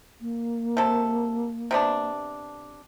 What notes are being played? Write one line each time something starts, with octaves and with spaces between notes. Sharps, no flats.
A#3
C3 A4
C3 B3 D4